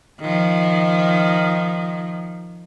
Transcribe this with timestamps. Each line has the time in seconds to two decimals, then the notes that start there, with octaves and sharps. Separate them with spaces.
0.20 D#3 F3